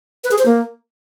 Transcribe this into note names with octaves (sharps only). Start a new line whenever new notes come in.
B4
G#4
C5
A#3